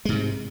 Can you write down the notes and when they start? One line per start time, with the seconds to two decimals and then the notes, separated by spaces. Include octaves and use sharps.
0.05 G#3
0.09 G#2
0.12 C3